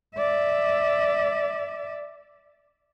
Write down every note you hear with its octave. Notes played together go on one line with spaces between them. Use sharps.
D5 E5